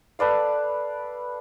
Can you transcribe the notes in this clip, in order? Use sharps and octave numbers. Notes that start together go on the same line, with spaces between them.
A4 B4 D5 F5